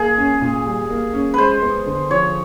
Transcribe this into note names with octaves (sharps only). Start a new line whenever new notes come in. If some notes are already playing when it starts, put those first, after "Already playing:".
Already playing: A#3 G#4
C#4
A#2
G3
A#3
C#4
G#3 B4 C5
B3
D3
F3 C#5